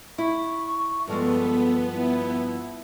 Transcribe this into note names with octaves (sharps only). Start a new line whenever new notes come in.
E4 C#6
G2 F3 G#3 B3 A4
E4